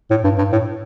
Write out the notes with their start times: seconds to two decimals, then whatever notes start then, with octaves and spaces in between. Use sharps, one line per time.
0.11 A2
0.24 G2
0.38 G2
0.52 A2